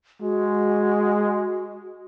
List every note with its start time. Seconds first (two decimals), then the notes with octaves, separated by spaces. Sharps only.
0.21 G#3 F#4